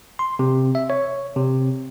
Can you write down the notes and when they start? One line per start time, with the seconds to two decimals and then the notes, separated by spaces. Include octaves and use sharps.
0.19 C6
0.39 C3
0.75 E5
0.90 C#5
1.36 C3